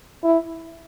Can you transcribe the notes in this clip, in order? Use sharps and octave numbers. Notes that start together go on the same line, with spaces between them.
E4